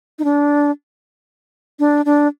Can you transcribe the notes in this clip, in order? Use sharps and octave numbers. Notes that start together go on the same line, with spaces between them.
D#4
D4
D4
D4